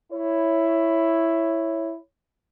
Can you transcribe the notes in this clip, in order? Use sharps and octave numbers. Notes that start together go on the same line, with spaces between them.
E4 C#5